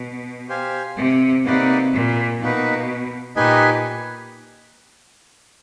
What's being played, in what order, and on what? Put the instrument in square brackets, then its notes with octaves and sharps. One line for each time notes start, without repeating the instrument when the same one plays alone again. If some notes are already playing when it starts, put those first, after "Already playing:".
Already playing: [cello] B2
[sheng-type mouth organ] G4 C5 F5 G#5
[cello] C3
[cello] C3 [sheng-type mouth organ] A#3 D#4 F#4 B4 D5
[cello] A#2
[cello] B2 [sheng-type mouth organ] A#3 D#4 F#4 B4
[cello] A#2 [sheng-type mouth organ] D#4 G4 B4 D#5 G#5